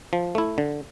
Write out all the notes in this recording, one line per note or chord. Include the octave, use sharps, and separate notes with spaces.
F3
A3 E4
D3